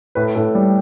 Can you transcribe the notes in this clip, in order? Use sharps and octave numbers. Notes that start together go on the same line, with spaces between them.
A2 B4
A2 A4
G3